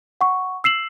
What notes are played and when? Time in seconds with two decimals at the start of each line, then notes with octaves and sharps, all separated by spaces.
0.21 F#5 C#6
0.64 E6 C7 E7 F#7